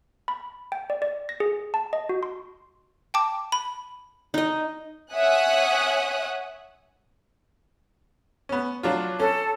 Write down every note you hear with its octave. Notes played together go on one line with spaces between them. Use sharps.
B5
G5
D5
D5
A#6
G#4
A5
D#5
F#4
C6
G5 A5 D6
B5
D#4 D#5
C#5 E5 F#5 G#5 D#6 F#6
B3 C#4
F#3 D4 F4
C#4 A4